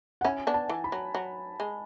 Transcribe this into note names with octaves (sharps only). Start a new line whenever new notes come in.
F#5
C#4 E4 G#5
B3 D4
A5
E3
B5
F#3
F#3
G#3